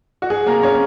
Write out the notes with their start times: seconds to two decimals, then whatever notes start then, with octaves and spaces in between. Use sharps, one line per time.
0.22 F#4
0.30 G#4
0.47 A#3 A#4
0.63 C#4 C#5